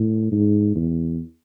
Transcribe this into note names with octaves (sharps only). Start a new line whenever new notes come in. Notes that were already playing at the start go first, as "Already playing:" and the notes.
Already playing: A2
G#2
E2